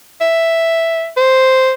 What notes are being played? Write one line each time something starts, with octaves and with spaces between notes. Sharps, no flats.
E5
C5